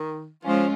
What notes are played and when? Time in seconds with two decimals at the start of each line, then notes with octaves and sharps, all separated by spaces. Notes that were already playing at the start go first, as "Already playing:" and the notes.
Already playing: D#3
0.45 F3 G#3 C#4 F4